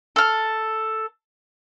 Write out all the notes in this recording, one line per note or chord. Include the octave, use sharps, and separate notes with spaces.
A4 F6